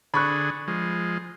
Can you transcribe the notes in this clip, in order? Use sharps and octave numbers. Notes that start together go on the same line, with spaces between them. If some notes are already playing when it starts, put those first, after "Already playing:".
D3 G#4 B5 C#6 F#6
F3 G#3